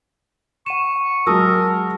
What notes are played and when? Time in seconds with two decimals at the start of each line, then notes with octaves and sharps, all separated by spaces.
0.66 F#5 C#6 D#7 E7
1.27 F#3 G#3 A#4 A5 D#6 E6